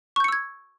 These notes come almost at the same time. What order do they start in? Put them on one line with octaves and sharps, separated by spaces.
C#6 G6 C#7 E6 G#6